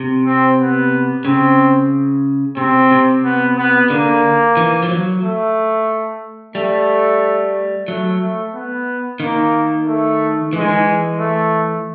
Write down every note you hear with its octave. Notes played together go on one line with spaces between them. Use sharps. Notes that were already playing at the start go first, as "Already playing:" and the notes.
Already playing: C3
C4
B3
C#3 C4
C3 C4
C3
B3
B3
D3 A#3
E3
F3
F#3
A3
G3 A3
F#3 A3
A3
B3
D#3 A#3
A3
E3 G#3
D#3
E3
A3